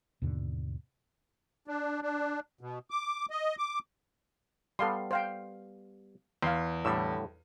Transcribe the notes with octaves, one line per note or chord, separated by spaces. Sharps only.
D#2 G#2 B2 D3
D4
D4
B2
D6
D#5
D6
G3 B3 A4 F5 C6
C5 F5 G5
E2 F5 C6
A2 D3 G3 E6